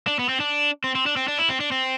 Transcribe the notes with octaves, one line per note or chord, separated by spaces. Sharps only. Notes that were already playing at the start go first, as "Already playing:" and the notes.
D4
B3
C4
D4
C4
C4
D4
C4
D4
E4
C4
D4
C4